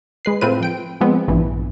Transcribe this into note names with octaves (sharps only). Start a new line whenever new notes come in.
G#3 B4 C7
A2 C4 F4 B4 D#7
F3 G5 D7
F3 G#3 B3 C4
A#1 G2 E3